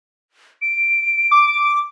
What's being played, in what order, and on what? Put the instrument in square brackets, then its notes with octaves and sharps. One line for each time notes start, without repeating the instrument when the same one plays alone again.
[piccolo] D7
[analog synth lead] D6